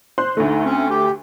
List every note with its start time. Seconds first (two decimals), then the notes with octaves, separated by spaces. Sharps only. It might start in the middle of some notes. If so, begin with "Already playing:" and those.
0.18 C5 C6 F#6
0.37 D2 D3 A3 D#4
0.65 C4 C#4
0.90 G4